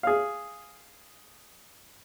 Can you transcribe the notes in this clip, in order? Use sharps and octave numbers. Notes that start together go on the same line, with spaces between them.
G#4 F5